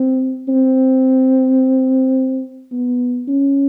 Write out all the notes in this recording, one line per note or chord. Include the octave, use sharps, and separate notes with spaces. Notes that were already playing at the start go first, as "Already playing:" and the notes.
Already playing: C4
C4
B3
C#4